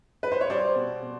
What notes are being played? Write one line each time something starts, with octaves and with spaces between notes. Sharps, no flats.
B4
C5
C#5
G3 C5 D5
B2
B2